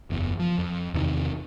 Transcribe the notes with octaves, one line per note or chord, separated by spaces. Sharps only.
F#1 E2
F3
F2
E2 C3 D#3